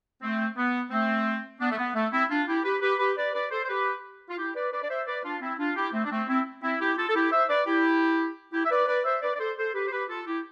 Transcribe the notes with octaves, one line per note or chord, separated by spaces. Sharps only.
A3 C4
B3
A3 C4
B3 D4
A3
B3
A3
C4 E4
D4 F4
E4 G4
G4 B4
G4 B4
G4 B4
B4 D5
B4 D5
A4 C5
C5
G4 B4
F4
E4 G4
B4 D5
B4 D5
D5
C5 E5
B4 D5
D4 F4
C4 E4
D4 F4
E4 G4
A3 C4
D4
A3 C4
C4 E4
C4 E4
E4 G4
F4 A4
A4
E4 G4
C5 E5
B4 D5
E4 G4
E4 G4
E5
B4 D5
B4 D5
C5 E5
B4 D5
D5
A4 C5
A4 C5
G4 B4
C5
G4 B4
F4 A4
E4 G4